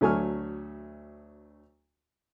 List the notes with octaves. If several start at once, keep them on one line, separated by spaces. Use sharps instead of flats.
D2 F#3 A3 G#5 C#6 F6